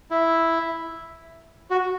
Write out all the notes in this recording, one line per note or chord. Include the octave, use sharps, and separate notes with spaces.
E4
F#4